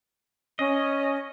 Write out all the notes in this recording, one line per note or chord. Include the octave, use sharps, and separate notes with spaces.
C#4 D#5